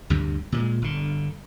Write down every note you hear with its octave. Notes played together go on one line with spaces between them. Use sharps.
D2 G2 C3
A#2 G3 G#3
G1 D3